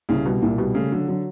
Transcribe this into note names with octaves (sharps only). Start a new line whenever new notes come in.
C2 C#3
B2 G3
C2 A#2
B2 G3
C#3 A3
D3 F#3
D3 F#3